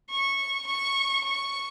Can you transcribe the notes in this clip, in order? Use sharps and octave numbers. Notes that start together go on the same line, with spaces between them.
C#6
C#6
C#6